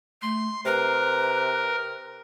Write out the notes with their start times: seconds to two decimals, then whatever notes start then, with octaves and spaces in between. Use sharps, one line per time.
0.22 A3 C6
0.65 C3 A#4 B4